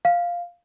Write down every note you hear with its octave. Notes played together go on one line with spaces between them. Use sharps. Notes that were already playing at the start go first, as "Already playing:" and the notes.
F5